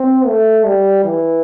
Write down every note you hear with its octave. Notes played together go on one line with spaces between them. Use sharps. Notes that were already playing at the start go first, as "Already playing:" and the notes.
Already playing: C4
A3
G3
E3